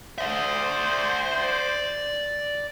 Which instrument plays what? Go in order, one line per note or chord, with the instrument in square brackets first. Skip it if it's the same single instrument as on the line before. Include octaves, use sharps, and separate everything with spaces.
[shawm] C5 [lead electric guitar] D5 E5